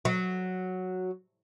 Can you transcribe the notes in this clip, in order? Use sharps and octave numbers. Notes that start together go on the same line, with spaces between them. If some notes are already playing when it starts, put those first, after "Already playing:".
F#3